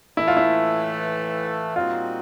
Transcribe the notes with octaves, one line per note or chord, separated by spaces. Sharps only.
A2 E3 A3 E4
F4
E4
A#2 G3 C4 D#4 F4 F#4